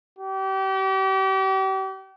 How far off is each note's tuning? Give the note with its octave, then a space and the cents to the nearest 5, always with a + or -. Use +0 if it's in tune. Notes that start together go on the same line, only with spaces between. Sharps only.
G4 -35